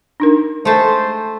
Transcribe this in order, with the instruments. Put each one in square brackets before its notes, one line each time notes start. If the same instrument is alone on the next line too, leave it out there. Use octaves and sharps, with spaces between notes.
[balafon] D4 D#4 A#4
[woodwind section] G#3 C5 [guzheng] A3 A5